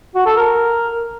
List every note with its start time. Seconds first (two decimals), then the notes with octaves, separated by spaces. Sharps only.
0.15 F#4
0.26 A4
0.36 A#4